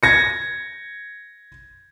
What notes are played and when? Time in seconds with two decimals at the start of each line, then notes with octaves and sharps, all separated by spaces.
0.03 G#6 A#6 C#7